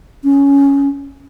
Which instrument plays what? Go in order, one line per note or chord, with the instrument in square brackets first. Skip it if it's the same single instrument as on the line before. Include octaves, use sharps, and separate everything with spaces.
[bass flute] C#4